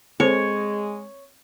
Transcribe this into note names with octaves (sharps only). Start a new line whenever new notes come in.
G#3 C4 A4 C5 C#5